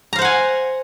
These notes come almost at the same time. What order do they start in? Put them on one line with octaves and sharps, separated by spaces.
A#5 F5 C5 F#5 G#5